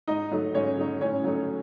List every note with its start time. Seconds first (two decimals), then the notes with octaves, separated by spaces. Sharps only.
0.08 G#2 D#4 D#5
0.32 F#3 A3 D#4
0.54 G#2 C#4 C#5
0.78 F#3 A3 D#4
1.01 A2 C#4 C#5
1.24 F#3 A3 D#4